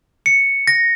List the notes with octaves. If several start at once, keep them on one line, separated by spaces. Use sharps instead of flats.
C#7
A#6